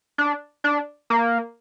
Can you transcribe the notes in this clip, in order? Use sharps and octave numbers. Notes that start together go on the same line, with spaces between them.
D4
D4
A#3